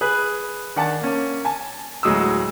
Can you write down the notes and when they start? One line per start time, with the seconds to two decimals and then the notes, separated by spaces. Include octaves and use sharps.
0.01 G#4 B4 F#6
0.76 D#3 D4 F#5 G#5 A5 A6
1.01 A#3 C#4
1.45 G#5 A5
2.03 D2 A2 F#3 G#3 D#6 E6